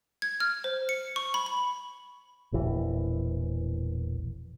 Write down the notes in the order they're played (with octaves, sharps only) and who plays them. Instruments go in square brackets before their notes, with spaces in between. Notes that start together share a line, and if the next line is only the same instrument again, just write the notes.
[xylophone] G#6
F6
C5
C#7
C#6
B5
B5
[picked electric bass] E1 A#1 E3